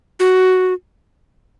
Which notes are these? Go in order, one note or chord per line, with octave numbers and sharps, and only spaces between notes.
F#4